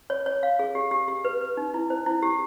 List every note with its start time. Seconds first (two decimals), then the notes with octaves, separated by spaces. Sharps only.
0.10 C#5
0.26 C#5
0.43 F5
0.59 G#4
0.75 G4
0.91 G4
1.08 G4
1.25 B4
1.41 B4
1.57 D#4
1.74 E4
1.90 C5
2.06 E4
2.22 G4